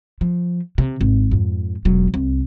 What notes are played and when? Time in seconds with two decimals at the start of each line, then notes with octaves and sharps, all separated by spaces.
0.21 F3
0.78 C3
1.01 G#1
1.31 F2 G#2
1.85 E1 F#3
2.14 C2